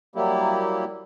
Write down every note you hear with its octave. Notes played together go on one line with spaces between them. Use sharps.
F#3 G3 A#3 E4 G4